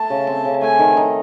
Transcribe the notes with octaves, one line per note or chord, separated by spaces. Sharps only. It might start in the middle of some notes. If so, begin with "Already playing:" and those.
Already playing: A3 A5
C#3
C4
C#3
A3 G#5
D#3
D#4